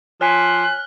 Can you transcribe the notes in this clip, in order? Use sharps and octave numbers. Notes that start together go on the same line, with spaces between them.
F3 C#5 G#5 F6 F#6 B6